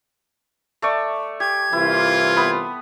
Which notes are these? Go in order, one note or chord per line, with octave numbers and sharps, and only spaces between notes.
A3 D5 C#6
G4 G#6
C2 E3 E4 F4
B3 B5 D#6